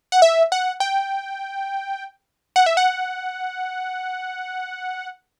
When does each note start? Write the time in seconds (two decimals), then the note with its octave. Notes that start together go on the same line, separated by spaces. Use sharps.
0.12 F#5
0.22 E5
0.52 F#5
0.80 G5
2.56 F#5
2.66 E5
2.77 F#5